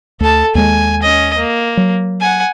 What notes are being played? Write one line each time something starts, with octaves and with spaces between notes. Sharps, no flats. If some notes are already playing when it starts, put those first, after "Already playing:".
D2 A4 A5
D#2 G#3 G#5
C#4 D#5
A#3
F#3
F#5 G#5